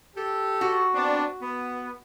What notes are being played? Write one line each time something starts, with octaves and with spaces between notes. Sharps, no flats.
G4 A4
F#4
B3 C4 D4
B3